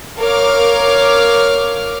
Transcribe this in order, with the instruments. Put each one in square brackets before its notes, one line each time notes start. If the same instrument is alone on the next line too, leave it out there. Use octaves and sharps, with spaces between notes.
[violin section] A#4 C#5 F5 D6 F6